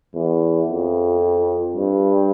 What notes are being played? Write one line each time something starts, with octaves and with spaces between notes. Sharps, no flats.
E2
F2
G2